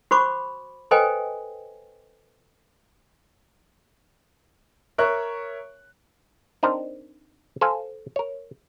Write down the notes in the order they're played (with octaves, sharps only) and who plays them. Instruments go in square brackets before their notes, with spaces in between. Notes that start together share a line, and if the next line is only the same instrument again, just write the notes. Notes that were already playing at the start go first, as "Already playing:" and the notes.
[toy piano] F#4 C5 B5 C#6 D6
A4 B4 C5 D#5 G5 G#5
[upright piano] A#4 C#5 E5 C#6 F#6
[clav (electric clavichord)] C4 D4 D#4 A#4 C5
A4 C5 F5 G#5
A#4 C#5